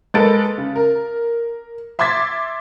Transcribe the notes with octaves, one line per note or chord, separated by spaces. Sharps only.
G#3 A#3 A4 B4 A6 D7
C#3
A#4
E5 C6 D6 G#6 A6 B6